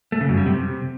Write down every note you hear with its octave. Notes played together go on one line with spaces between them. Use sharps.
A3
C#3
F#2
G3
C3